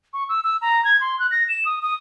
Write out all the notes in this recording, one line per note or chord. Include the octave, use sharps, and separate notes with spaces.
C#6
E6
E6
A#5
G#6
C6
F#6
A#6
E7
D#6
D#6